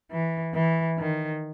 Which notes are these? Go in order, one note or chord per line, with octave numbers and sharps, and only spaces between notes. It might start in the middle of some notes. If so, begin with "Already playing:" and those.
E3
E3
D#3